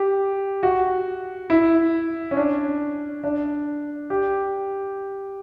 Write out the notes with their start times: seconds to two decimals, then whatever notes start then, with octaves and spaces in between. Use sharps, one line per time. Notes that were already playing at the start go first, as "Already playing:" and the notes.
Already playing: G4
0.63 F#4
1.50 E4
2.31 C#4
2.37 D4
3.24 D4
4.10 G4